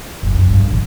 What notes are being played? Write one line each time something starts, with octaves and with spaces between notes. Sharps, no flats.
F#1
F#1 F#2
G2
A#1 D#3